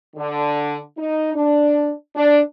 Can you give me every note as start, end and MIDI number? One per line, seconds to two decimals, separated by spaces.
0.16 0.77 50
0.97 1.32 63
1.34 1.92 62
2.15 2.39 62